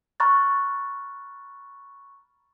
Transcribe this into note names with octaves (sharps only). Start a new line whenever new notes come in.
A#5 B5 C#6 F6 F#6 A6